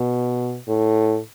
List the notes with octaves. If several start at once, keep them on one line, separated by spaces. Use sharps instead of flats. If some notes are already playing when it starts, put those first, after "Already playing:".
Already playing: B2
A2